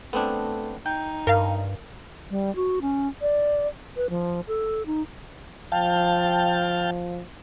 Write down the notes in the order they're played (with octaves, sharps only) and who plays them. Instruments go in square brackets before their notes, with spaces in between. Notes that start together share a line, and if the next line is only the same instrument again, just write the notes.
[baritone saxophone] A3 [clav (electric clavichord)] B3 C4 D4
[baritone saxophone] D#4 [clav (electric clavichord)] G5
[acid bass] G2 [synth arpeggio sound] A#4 F5
[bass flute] G3
F#4
C#4
D5
B4
F3
A4
D#4
[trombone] F3 [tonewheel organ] F5 G5 A5